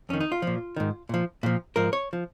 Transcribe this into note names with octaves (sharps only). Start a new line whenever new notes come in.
F2 D#3 C#4
D#4
F4
A#2 F3
G#2 D#3
A#2 F3
A#2 F3
G#2 F3 A#4
C#5
F3